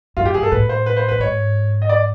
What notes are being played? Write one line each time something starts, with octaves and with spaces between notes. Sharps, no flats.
F#2 F4
G4
G2 G#4
A4
A2 B4
C5
B4
C5
G2 B4
G#2 C#5
D#5
D5